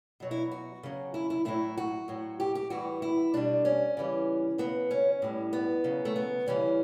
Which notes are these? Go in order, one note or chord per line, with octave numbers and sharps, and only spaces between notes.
B2 F#3
E4
F#4
C#3 F#3
E4
E4
A2 F#3 E4
F#4
A2 F#3
G4
G4
A2 E3 G3 F#4
E4
B2 G3 D4
C#4
C#3 E3 G3
C#3 F#3 B3
C#4
A2 G3
B3
C#3 F#3
A3
B3
C#3 E3 G3 C#4